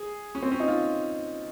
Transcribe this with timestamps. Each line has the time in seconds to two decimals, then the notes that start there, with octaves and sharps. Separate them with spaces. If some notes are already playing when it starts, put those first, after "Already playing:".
Already playing: G#4
0.35 C#4
0.43 C4
0.51 C#4
0.60 D#4
0.68 F4